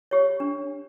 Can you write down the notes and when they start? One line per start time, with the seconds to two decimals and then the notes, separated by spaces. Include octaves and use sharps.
0.11 G4 C#5
0.40 D4